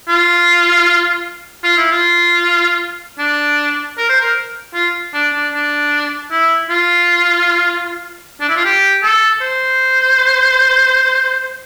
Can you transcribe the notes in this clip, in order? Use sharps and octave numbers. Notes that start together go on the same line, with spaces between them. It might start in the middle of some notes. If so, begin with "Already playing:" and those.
F4
F4
E4
F4
D4
A#4
C5
A#4
F4
D4
D4
D4
E4
F4
D4
E4
F4
G4
A4
C5